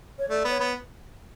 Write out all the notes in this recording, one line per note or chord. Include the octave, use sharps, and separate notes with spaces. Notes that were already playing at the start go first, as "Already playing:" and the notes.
C#5
A3 D5
B3 C#5
B3